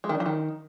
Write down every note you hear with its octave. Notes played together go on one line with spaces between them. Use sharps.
G#3
D#3
D4
F3
D#3